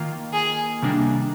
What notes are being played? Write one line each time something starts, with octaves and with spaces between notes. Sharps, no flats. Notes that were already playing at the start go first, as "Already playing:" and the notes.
Already playing: D#3 A#3 F4
G#4
C3 D#3 G3 A#3 D4